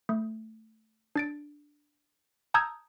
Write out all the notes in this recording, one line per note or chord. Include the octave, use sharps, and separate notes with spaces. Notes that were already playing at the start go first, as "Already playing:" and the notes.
A3
D4 A6 D7
A5 A#5 D#6 E6 G6 G#6